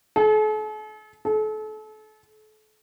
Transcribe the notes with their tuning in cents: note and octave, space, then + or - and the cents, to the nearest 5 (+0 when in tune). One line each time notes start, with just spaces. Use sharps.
A4 -45
A4 -35